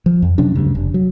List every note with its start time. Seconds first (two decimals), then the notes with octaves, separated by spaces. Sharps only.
0.06 F3
0.22 F2
0.38 C3 F#3 C#4 D4
0.55 D2 G2 C#3
0.75 F1
0.94 F#3